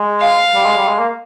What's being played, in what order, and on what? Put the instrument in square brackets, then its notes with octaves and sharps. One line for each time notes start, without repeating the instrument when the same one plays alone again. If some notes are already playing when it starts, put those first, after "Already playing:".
Already playing: [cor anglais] G#3
[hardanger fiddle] F5
[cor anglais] G3
G#3
G3
G#3
A#3